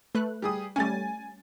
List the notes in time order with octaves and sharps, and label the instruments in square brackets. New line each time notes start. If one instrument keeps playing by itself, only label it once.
[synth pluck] A3 B4 F#6
[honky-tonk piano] G3 G#4 D#6
[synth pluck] G3 A3 C#4 [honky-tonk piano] G#5 A6